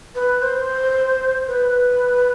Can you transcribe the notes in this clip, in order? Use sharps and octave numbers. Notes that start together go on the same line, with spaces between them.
B4
C5
B4